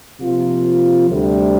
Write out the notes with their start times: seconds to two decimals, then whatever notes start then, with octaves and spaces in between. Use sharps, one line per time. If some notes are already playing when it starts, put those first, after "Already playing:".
0.19 C3 F3 A#3 F4
1.09 D2 C3 G3